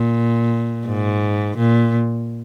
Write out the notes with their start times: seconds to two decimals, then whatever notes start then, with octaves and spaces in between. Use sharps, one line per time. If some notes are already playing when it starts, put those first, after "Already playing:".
Already playing: A#2
0.86 G#2
1.58 A#2